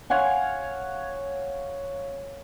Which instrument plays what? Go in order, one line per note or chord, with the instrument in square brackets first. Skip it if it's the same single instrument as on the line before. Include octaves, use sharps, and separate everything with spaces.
[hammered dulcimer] C#5 F5 F#5 G#5